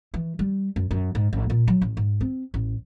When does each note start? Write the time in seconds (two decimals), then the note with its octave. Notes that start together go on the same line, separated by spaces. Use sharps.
0.14 E3
0.39 G3
0.76 F#2
0.91 F#2
1.15 G#2
1.33 A1
1.50 A#2
1.68 F#3
1.82 A1
1.97 G#2
2.21 C4
2.54 A1